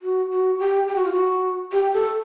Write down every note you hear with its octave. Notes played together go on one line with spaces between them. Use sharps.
F#4
F#4
G4
G4
F#4
F4
F#4
G4
A4